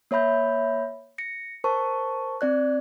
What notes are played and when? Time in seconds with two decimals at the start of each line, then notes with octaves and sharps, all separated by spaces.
0.11 A#3 C#5 E5 B5 G6
1.18 A#6 C#7
1.64 A#4 C5 A5 C#6
2.41 C4 D5 F#6